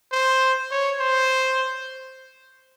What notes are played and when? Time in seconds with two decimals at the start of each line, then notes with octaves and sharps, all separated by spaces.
0.12 C5
0.71 C#5
1.00 C5